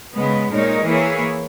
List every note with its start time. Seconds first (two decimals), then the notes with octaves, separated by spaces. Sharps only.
0.14 C#3 G#3 B3
0.49 A#2 G#3 D#4 A#4 C#5
0.85 E3 A#3 E4 G#4 C#5